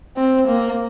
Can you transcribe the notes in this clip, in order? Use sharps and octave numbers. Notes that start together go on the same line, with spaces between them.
C4
A#3